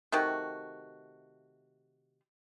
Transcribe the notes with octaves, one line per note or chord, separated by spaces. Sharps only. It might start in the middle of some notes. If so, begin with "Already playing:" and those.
C3 D#3 A3 F#4